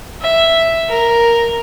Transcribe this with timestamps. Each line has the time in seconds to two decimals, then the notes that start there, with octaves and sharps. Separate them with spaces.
0.22 E5
0.90 A#4